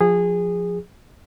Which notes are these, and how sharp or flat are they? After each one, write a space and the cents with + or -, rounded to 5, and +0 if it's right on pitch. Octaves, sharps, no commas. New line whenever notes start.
F3 +20 G#4 -20